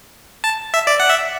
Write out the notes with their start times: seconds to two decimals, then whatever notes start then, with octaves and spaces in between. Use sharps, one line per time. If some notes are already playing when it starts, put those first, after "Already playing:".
0.44 A5
0.74 E5
0.87 D5
1.00 F#5
1.09 E5